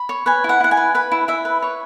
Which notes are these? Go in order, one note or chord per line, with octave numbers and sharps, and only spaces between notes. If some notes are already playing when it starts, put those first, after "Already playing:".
Already playing: B5
C#5
B4 G#5
E4
F#5
E4 F#5
G#5
B4
B4 B5
E4
E4 E5
B4
C#5